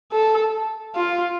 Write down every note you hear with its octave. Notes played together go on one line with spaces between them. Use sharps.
A4
F4